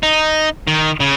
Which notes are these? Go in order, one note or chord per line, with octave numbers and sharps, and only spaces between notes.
D#4
D#3
C#3